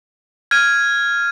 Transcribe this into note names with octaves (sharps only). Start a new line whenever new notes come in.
F6 G#6 D#7